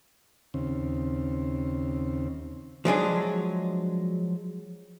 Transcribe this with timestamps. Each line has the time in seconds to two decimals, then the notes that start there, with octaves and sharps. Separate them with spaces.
0.54 D#2 C#3 C4
2.85 F3 F#3 G#3 D4